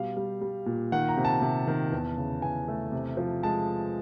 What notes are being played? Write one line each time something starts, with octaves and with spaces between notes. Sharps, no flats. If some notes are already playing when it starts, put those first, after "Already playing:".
Already playing: B2 G3 F5
G3
G3
A#2
D#3 F#5
A#5
C3
A5
C3
D#3
E2
C#3
E2 G#5
A3
C3
F3
G#3 A5